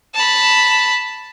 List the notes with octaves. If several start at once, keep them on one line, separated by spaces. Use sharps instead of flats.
A5 B5